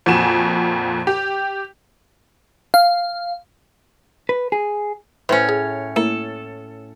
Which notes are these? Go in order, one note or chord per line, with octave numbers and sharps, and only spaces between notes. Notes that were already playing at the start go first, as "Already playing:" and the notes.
F2 A#2 F#4 G#5 E7
G4
F5
B4
G#4
A2 C#4 B4 C5
G#4
A3 A#3 E4 A4